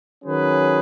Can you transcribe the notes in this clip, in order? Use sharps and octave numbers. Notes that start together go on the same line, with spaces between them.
D#3 F#3 C#4 G#4 B4